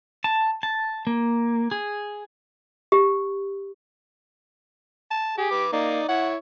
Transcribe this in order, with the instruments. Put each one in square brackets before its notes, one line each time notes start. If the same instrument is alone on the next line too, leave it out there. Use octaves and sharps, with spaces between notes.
[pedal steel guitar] A5
A5
A#3
G#4
[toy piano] G4
[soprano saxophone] A5
[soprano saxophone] G4 [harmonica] G#4
[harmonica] B4 D6
[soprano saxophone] A#3 [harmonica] D#4 D5
[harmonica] E4 C#5 [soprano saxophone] F#5